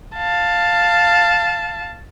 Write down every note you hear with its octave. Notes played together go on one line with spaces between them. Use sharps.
F5 A5